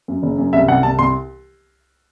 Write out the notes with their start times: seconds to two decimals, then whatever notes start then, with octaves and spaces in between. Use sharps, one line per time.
0.08 F#2
0.23 F#1
0.38 F#2
0.53 C2 E5
0.68 C2 F#5
0.83 C2 A5
0.99 C2 C6